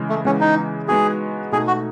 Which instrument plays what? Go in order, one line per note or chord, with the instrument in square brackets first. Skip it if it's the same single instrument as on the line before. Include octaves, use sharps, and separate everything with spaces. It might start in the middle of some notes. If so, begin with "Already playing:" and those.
Already playing: [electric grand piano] C#3 E3 G#3
[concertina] A3
[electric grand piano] C#3 E3 G#3 B3 [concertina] C#4
[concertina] D#4
[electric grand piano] G#3 B3 D#4 F#4 [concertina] G#4
[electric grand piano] B2 A3 D#4 [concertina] G#4
[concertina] F#4